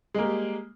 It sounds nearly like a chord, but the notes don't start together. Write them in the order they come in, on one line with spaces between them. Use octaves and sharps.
G#3 A#3 G3